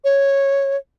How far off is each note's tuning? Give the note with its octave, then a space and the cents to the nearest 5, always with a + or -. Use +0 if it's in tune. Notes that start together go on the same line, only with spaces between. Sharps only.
C#5 -5